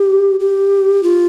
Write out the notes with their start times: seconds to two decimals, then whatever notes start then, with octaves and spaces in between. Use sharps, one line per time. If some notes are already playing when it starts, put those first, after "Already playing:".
Already playing: G4
0.40 G4
1.03 F4